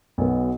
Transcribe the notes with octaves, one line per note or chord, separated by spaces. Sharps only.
B1 B2 B3